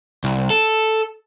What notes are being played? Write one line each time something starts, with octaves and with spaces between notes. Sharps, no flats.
C2
A4